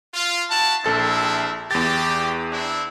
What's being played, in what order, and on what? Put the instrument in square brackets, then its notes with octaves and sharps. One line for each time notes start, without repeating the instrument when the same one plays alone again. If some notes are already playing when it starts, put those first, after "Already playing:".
[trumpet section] F4
E4 F#4 A5
[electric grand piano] A#1 A4 A6 [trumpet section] C4 E4
[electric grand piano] E2 A6 [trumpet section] G4
[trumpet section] C4 D4 E4